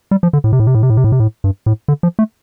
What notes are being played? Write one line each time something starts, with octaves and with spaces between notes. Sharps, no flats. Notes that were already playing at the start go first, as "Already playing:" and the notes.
G3
F3
D3
A2
C3
A2
C3
A2
C3
A2
C3
A2
C3
A2
G2
A2
D3
F3
A3